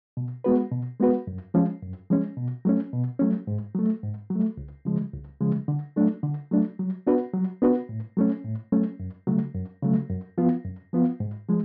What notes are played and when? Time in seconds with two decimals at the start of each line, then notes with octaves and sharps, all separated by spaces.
0.17 B2
0.44 G#3 B3 F#4 B4
0.71 B2
1.00 G#3 B3 F#4 B4
1.27 F#2
1.54 F3 G#3 C#4
1.82 F#2
2.10 F3 G#3 C#4
2.37 B2
2.65 F#3 A3 C#4
2.93 B2
3.19 F#3 A3 C#4
3.47 G#2
3.75 F#3 A3
4.03 G#2
4.30 F#3
4.35 A3
4.57 C#2
4.85 C#3 F3 G#3
5.13 C#2
5.41 C#3 F3 G#3
5.68 D3
5.96 F#3 A3 D4
6.23 D3
6.51 F#3 A3 D4
6.79 F#3
7.07 B3 D4 F#4 B4
7.34 F#3
7.62 B3 D4 F#4 B4
7.89 A2
8.17 F#3 A3 C#4
8.44 A2
8.72 F#3 A3 C#4
9.00 F#2
9.27 C#3 F#3 A3
9.55 F#2
9.82 C#3 F#3 A3
10.10 F#2
10.38 F3 B3 F4
10.65 F#2
10.93 F3 B3 F4
11.20 G#2
11.48 F3 G#3